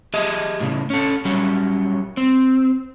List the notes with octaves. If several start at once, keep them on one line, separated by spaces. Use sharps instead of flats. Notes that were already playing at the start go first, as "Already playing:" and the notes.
G4 G#4 D#5 E5
A2 C#3
C#4 A4
F#3 G3 C#4
C4